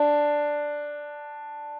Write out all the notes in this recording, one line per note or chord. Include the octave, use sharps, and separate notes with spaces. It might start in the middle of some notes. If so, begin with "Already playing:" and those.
Already playing: D4